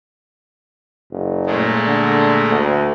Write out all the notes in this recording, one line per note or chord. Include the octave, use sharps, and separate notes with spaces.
F#1
A#2 G#3 A3
D3
D2